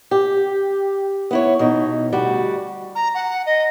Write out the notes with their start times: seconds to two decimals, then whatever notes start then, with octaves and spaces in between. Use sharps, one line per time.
0.11 G4
1.31 B3 E4 C#5
1.59 B2 E3 D#4
2.12 D2 G3 F#4
2.95 A#5
3.14 F#5
3.46 D#5